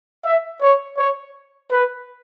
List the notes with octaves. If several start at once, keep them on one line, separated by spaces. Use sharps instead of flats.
E5
C#5
C#5
B4